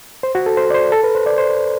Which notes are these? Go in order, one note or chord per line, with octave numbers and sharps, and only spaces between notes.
C5
F#4
A4
C5
D5
C5
A4
B4
C5
D5
C5